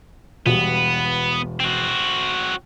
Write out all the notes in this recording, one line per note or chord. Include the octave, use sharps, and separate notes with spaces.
E1 G3 B3
C4 F#4